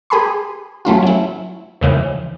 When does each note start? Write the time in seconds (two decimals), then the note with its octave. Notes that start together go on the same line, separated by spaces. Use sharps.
0.10 G4 G#4 G#5 B5 C6
0.85 F#3 A3 C#4 F4
1.03 F#3 E4
1.81 D#2 C#3 E3 F3